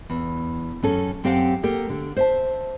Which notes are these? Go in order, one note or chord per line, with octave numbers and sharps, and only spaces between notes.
E2
F#2 C#4 A4
F#2 C4 G4 F5 F#5
A#3 G4 A4 A#4
D3
C5 E5 A5